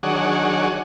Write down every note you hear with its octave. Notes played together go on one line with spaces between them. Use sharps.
D#3 F#3 D4 G#4 C#5 F#5